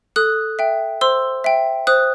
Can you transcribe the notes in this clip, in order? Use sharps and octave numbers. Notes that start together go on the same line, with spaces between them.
A4 D#6 F#6
E5 G5
C5 C6 E6
E5 G5
C5 D#6 F#6